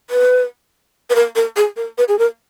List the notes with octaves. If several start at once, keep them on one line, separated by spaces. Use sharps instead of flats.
B4
B4
A#4
A#4
G#4
A#4
B4
G#4
A#4